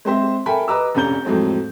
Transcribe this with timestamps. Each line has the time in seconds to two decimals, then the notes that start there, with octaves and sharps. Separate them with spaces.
0.05 G#3 C4 C5 E5
0.46 A4 A#4 E5 G5 G#5 B5
0.68 B4 D#5 A#5 D6 E6
0.95 F1 A#1 C#4 A#5 G6 G7
1.25 F2 A2 F#3 G#3 C4